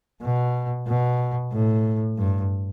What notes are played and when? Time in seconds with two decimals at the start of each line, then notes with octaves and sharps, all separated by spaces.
0.21 B2
0.87 B2
1.52 A2
2.17 G2